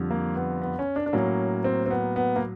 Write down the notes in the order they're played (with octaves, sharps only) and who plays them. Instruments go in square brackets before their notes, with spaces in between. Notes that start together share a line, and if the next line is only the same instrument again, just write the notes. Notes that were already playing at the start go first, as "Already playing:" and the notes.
Already playing: [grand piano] F2 D3 G3
A#3
B3
B3
C#4
D4
D4
A2 F#3 A#3 C#4
C4
C4
B3
B3
A#3